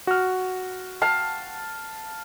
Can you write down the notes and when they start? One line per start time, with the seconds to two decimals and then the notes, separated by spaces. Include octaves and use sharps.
0.07 F#4 F6
1.02 F5 A5